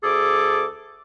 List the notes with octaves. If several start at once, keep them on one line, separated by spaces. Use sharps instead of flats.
D2 G#4 A4 D6